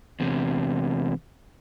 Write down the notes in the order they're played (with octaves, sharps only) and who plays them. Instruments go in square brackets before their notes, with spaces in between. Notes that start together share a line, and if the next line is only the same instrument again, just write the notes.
[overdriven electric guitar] E2 C3